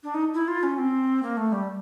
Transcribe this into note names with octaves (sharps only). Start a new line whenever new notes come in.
D4
D#4
E4
F4
C#4
C4
A#3
A3
G3